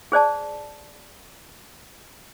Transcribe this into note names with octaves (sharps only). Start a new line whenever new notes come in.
G#4 C5 D5 A5